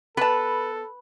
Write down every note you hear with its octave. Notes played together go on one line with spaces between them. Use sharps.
B3 A4 B4 A5